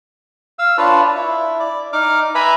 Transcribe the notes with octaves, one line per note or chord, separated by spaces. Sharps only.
F5 E6
D4 F4 B4 C#5 A5
E4
D5
D#4 D6 F6
B4 E5 G#5 A#5 B5